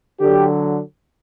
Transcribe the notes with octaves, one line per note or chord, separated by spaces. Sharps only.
D3 F#3 G4